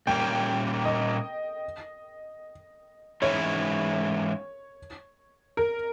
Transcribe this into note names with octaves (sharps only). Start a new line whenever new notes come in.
A#2 G3 A#3 C#4 G5
D#5
G#2 E3 G#3 C#4 E4 C#5
A#4